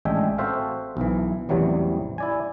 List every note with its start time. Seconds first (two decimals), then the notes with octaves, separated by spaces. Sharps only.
0.05 A1 G#3 D4 E5 G5 G#5
0.38 C4 F#4 A4 C5 E5 F5
0.97 B1 E3
1.49 A1 E2 C3 E3 F#3 G3
2.18 E4 D5 G#5